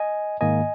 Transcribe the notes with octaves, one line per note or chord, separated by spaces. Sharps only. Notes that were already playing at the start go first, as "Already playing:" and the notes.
Already playing: D#5 G#5
G#2 D#3 A#3 D#5 G#5